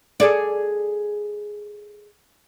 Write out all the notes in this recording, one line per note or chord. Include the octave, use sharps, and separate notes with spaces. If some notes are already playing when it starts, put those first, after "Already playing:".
G#4 A4 D5